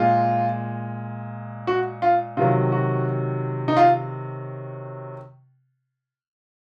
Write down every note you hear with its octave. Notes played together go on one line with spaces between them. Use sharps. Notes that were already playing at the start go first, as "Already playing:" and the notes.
Already playing: A#2 G#3 F4
F#4
F4
C3 D#3 F#3 F4
F#4
D#4
F4